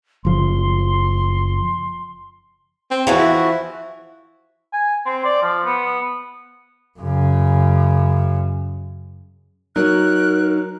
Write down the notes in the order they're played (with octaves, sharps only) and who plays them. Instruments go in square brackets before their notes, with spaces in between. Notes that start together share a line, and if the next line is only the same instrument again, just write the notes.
[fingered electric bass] F#1 F3 [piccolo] C6
[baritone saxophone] C4
[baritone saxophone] E2 [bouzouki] E3 F3 F#4
[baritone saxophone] E4
[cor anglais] G#5
C4
D5
F3
B3
[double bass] F#2 C#3
[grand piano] F#3 [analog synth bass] D#4 [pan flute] A#4 [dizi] F#6